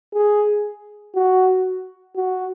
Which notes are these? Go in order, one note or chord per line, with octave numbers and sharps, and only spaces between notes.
G#4
F#4
F#4